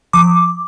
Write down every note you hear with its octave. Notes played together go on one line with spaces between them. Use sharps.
F3 D6